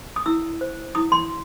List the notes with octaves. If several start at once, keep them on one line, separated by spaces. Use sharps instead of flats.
D#6
E4 E6
C5
E4 D#6
C6